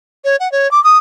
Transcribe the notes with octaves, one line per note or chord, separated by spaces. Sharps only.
C#5
F#5
C#5
D6
D#6